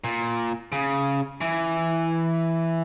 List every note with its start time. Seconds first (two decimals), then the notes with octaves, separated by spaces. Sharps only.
0.04 A#2
0.72 C#3
1.41 E3